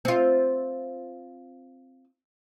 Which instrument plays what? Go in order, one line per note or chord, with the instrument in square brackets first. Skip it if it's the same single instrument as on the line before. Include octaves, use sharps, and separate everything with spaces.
[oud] C4 F4